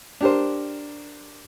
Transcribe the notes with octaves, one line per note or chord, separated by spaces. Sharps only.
D4 G4 A#4 C5